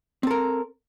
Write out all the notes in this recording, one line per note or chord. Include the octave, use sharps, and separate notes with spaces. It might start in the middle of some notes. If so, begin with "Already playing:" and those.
C4 A4 A#4